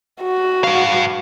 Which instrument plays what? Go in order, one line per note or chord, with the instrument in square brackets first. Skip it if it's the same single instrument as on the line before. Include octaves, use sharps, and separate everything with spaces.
[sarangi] F#4
[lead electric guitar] G2 F5